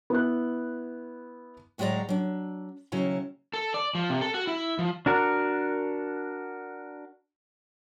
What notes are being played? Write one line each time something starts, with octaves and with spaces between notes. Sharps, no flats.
B3 E4 B4 F#6
D2 A2 F#3 G#3 D5 A#5
F#3 D4
D#2 C#3 F#3 E4 A#5
A4
D5
F3
C3
A4
F#4
E4
F3
D4 F#4 A#4